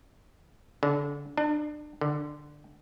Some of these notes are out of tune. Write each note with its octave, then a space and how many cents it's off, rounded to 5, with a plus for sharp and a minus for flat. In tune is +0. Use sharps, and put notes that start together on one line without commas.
D3 -30
D4 +35
D3 +10